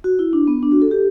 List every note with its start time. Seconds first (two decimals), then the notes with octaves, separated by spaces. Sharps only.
0.04 F#4
0.19 E4
0.33 D4
0.48 B3
0.63 D4
0.72 F#4
0.82 A4
0.91 G4